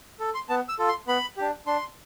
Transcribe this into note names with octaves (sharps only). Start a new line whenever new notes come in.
A4
C6
B3 A5
E6
F4 A4
C6
B3 B5
D4 G4
D4 C6